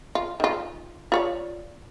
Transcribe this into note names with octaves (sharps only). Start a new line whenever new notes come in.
F4
D#3 F4
F4 C#5 D5